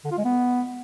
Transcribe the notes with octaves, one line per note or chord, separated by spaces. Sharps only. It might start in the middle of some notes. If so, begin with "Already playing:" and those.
D3
F4
G#3
B3